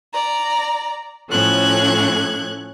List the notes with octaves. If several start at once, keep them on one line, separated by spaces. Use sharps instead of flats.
D5 A#5
A2 F3 C#4 A4 F#6 G#6